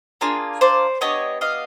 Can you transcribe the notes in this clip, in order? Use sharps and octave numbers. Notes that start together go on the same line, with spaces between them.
A#3 D4 F4 G#4
C5 D5
B3 D4 G4 C#5 D#5
D#5 F5